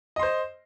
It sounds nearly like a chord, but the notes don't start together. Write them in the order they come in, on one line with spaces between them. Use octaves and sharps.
D#5 C6 C5